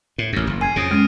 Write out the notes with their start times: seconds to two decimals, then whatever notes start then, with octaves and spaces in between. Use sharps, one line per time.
0.18 A2
0.33 A1 F#2
0.47 F#1
0.61 G#5 G#6 C7 D#7
0.76 F2 C#3 D#6 A#6 D7
0.91 G#3 C#4 F6 D#7